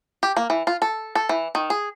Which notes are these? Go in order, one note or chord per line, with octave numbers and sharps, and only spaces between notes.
G4
A#3
E3
F4
A4
A4
E3
D#3
G#4